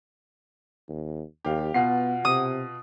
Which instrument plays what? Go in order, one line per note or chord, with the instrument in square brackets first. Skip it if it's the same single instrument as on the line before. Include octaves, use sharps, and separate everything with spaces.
[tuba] D#2
[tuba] D#2 [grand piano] G4 F5
[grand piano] B2 F4 C7 [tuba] B3 [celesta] F#5
[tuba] C3 [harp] D#6